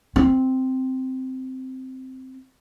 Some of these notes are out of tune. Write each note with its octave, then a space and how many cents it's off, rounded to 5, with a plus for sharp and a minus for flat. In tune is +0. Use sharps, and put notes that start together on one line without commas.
C4 -5